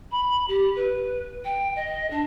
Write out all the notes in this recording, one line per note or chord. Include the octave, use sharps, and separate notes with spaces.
B5
G4
B4
G5
D#5
D4